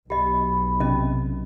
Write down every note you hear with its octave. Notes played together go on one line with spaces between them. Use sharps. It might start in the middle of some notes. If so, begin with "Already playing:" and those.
B1 G4 D#5 B5
C3 C#4 D#5